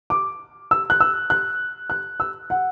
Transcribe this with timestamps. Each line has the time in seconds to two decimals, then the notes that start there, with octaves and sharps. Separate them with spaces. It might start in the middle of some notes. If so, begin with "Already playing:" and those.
0.10 D6
0.71 E6
0.90 F#6
1.00 E6
1.30 F#6
1.90 F#6
2.20 E6
2.50 F#5